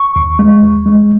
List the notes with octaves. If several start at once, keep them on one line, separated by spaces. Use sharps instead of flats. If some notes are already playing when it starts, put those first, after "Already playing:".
Already playing: C#6
D#2
G#3
D#2
G#3